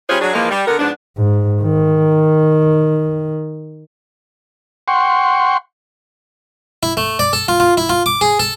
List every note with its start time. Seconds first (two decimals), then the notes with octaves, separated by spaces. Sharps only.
0.09 G3 C#4 F4 G#4 C5 C#5
0.21 F#3 D4 G#4
0.34 E3 F3 G#3 A#3
0.51 G3
0.68 D3 B3 A#4
0.79 G#2 F3 B3 D4
1.17 G#2
1.62 D#3
4.88 F#5 G5 C6 C#6
6.83 E4
6.97 A3
7.19 D5
7.33 A4
7.48 F4
7.60 F4
7.77 E4
7.89 F4
8.06 D6
8.21 G#4
8.39 A4